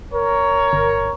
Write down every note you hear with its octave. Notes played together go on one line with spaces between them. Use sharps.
A#4 C#5
G1